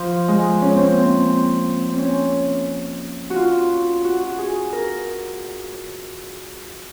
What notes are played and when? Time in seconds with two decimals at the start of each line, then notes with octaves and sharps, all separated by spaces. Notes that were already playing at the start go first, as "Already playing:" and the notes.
Already playing: F3
0.28 G#3
0.62 C#4
0.76 C4
0.90 A#3
1.04 C4
1.90 C4
1.99 C#4
3.30 F#4
3.36 F4
4.04 F#4
4.27 F#4
4.38 G#4
4.72 A#4